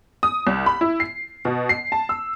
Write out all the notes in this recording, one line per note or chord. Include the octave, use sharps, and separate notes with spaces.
D#6
C2
B5
E4
C7
B2
C7
A5
E6